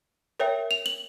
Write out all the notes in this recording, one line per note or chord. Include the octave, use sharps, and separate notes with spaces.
A#4 C#5 E5 G5
F7
F#7